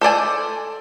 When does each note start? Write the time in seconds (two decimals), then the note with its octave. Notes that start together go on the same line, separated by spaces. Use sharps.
0.01 A4 C5 D5 G#5